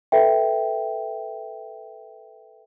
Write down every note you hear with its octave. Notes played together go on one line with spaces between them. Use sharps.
A4 B4 E5 G5